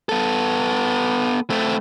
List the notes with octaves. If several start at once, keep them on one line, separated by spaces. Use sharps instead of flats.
B3 A4
A3 C4